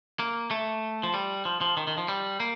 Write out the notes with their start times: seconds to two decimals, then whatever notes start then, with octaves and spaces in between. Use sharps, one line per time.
0.19 A#3
0.51 A3
1.03 F3
1.14 G3
1.45 F3
1.61 F3
1.77 D#3
1.87 D#3
1.98 F3
2.08 G3
2.40 A#3